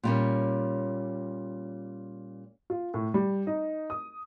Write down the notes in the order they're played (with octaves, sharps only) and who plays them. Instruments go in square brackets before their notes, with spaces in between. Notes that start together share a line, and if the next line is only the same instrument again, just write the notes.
[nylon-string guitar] A#2 G3 C#4
[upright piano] F4
A2
G3
D#4
D#6